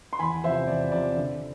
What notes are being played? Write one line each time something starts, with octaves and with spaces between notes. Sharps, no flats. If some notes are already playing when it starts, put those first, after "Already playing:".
C6
E2 G#5 B5
C3 F3 C5 E5
E2 D5
C3 F3 D5
D3